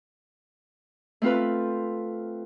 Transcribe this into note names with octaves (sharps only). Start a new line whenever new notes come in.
A3 C4 F4 B4